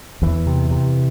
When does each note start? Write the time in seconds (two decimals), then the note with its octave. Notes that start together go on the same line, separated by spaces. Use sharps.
0.22 E2 E3
0.47 C3
0.71 C3